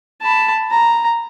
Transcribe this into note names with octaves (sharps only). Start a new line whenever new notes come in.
A5 B5
A#5